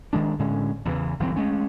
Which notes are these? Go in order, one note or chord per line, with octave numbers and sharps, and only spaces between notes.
D#3 G#3 D4
A2 D3 G#3 C#4
E2 C#3 E3
G1 E3 F#3 C4
G#3 A3 C#4